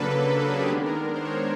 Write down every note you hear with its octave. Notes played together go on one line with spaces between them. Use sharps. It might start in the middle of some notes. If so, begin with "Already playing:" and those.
Already playing: C#3 F#3 A#3 D4 A4 B4
A4
G#4
G4
D#3 G#3 B3 D4 G4
A#4
C5
C#5
C5